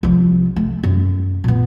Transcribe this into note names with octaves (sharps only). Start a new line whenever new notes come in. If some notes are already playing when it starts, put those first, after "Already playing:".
C2 F3
A3
F#2
A#2 B3